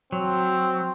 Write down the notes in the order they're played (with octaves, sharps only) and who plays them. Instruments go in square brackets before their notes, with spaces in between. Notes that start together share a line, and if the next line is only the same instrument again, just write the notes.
[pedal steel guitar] F#3 [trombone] C4